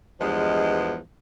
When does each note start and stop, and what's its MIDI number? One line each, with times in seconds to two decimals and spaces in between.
0.20 0.97 40
0.20 0.97 43
0.20 0.97 53
0.20 0.97 56